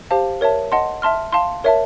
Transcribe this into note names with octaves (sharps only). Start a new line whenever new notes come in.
G4 C5 F5 A5
A#4 C#5 E5 A5
D#5 F#5 A5 C6
E5 A5 C6 F6
F5 A5 C6
A#4 C#5 E5 A5